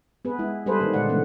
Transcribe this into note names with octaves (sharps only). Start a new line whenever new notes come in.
B3 G#4 B4
G#3 E4
G3 G#4 A4 B4 C5
D#3 A#3 D#4
A#2 D3 G#3 D#4 D5 F#5
C#3 E3 G#3 A3 B3